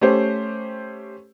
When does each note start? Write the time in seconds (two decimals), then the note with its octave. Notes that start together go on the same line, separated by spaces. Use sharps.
0.01 A3 C#4 G4 C5